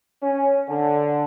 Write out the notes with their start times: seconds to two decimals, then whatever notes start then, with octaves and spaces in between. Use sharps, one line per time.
0.23 C#4
0.69 D3